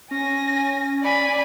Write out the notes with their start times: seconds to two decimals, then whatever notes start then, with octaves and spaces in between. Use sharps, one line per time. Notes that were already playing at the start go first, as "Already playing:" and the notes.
0.11 C#4 G#5 A#6
1.03 D5 G#5 B5